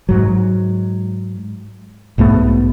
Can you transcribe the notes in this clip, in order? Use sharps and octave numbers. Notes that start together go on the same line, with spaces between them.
G#2 F#3
B1 G#2 A3 B3